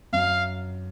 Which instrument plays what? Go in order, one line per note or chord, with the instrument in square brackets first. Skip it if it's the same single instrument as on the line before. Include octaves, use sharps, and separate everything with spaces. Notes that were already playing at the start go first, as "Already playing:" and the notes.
[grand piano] F#2 [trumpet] F5